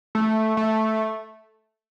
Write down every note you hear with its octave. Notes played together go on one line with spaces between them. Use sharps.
A3
A3